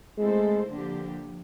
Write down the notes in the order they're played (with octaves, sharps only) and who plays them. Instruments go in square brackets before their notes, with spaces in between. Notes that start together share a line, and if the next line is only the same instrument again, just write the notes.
[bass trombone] G#3 [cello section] A3 C4 E4 A4 C5
[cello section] D3 F3 A#3 D4 G4